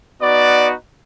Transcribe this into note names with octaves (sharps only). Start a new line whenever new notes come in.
B3 D#4 F#4 D5